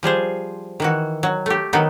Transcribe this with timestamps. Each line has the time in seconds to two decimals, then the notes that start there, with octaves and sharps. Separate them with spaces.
0.03 F3 G3 G#4 C5
0.80 D#3 E3 F#4
1.23 F#3
1.46 A3 G4
1.73 D#3 F#3 B3 D#4